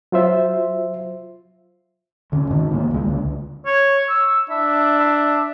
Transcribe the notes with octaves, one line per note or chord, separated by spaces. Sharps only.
F#3 F4 C5 E5
D2 D3 C#4
G#2 D#3
C#2 A#3
C#2 G#3
C#2 D3
C#5
E6
D4 E5
E5